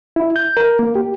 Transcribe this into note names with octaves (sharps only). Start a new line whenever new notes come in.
E4
G6
A#4
A#3
G4